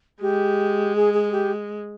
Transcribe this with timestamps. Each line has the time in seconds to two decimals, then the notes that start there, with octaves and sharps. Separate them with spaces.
0.22 G#3 G4
0.96 G#4
1.14 G#4
1.32 G4